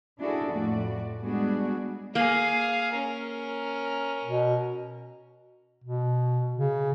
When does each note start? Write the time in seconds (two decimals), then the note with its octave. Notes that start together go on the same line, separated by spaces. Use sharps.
0.19 D4 E4 F#4 G#4 A4
0.52 F2 A2 A3 F#4 D5
1.21 G3 G#3 B3 D4 F#4 G#4
2.15 A#3 G#4 F5
2.92 C#4 A#4
4.24 B2
5.84 B2
6.58 C#3